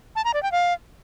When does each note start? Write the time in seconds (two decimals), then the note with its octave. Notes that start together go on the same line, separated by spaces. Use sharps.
0.16 A5
0.25 A#5
0.34 D5
0.43 G5
0.52 F5